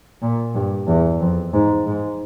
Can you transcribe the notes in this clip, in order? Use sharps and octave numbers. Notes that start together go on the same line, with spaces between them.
A#2
G2
E2
F2
G#2
G#2